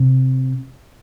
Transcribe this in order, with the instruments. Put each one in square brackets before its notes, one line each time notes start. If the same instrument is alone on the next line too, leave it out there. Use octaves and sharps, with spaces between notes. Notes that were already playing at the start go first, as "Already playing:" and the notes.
Already playing: [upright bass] C3